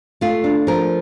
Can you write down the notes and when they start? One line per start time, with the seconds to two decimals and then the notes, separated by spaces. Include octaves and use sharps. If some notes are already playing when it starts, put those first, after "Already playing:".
0.21 A3 F4
0.44 D4
0.67 F3 A#4